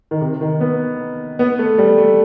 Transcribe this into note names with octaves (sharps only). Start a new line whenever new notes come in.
D#3
C3
D#3
B3
B3
A3
G3
A3